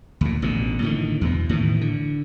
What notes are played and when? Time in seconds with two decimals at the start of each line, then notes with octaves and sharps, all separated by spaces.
0.21 D2 A#2
0.42 A1 B2 D3
0.82 A2 D3 D#3
1.21 E2 B2
1.49 A2 D#3 E3
1.81 D3